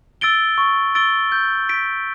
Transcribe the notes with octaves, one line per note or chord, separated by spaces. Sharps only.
E6 A6 D7 G7
C#6
E6 A6 D7 G7
G6
B6 D7